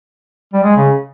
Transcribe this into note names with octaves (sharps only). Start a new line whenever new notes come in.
G3
G#3
C#3